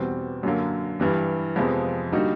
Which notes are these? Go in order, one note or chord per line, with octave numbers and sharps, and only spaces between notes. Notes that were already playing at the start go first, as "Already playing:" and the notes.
Already playing: E2 B2 G3 C4
F#2 D3 F#3 A#3
G2 E3 G3
F2 C3 F3 G#3 B3
D3 G3 A#3 D#4 F#4